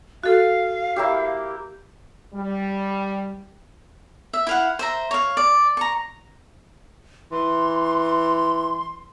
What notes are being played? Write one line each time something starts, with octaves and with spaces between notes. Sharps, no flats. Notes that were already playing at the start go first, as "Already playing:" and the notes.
F#4 A4 F5
A#3 E4 G4
G3
E5
E4 F5 F#5
C5 E5 A#5
C#5 F5
D5
A#5 C#6
E3 C6